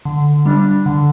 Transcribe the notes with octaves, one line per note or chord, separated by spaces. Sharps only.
D3
G3 D4
D3